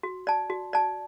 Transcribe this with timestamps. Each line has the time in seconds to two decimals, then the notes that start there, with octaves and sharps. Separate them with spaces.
0.03 F#4
0.27 D5 A5
0.50 F#4
0.73 D5 A5